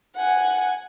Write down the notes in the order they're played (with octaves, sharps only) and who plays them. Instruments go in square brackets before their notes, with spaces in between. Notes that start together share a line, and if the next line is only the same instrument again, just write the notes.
[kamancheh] F#5 G#5